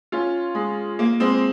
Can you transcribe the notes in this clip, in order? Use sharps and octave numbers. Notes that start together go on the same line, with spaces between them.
C#4 F4
G#3
A#3
G#3 C4